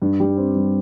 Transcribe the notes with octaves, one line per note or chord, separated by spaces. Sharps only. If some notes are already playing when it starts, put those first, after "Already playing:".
G2
G3
C4
G2